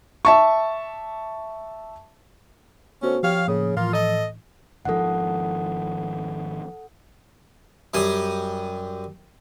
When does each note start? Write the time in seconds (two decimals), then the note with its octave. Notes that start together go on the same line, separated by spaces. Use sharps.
0.25 E5 A5 C#6
3.02 D3 A3 B3 C#4 F#4 C5
3.23 F3 G4 C#5 F5 G5
3.47 A2 C#3 A#3 D#6
3.76 A2 E3 A#3 F4
3.92 A4 D#5
4.85 G#1 D#3 F3 A4 F#5
7.94 F#2 G3 G#5 D#6